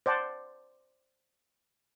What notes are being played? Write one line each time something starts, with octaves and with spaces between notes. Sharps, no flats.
C5 D5 F#5 A5